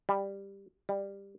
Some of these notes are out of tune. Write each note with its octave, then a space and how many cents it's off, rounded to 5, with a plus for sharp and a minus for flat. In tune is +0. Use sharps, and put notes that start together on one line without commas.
G3 +10
G3 +15